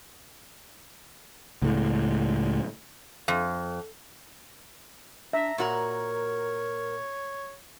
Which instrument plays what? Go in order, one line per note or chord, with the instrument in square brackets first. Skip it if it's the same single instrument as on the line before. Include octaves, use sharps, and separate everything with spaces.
[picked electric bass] C#2 A2
[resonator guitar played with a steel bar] F2
[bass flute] D4 [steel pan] E5 [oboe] A#5
[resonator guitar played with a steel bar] A#2 F#4 A#5 [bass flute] A#4 [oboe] C#5